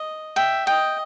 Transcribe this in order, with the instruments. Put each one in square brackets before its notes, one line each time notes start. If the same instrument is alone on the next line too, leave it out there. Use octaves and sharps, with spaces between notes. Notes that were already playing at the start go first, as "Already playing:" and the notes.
Already playing: [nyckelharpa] D#5
[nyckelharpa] E5 [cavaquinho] G5
[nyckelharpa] D#5 [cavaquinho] G5